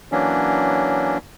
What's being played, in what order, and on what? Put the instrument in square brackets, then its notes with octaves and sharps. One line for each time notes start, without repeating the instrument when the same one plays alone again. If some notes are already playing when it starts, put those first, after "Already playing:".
[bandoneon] E3 F#3 A#3 C#4 D4